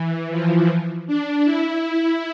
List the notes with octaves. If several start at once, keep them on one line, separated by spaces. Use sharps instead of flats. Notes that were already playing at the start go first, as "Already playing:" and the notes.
Already playing: E3
F3
D4
E4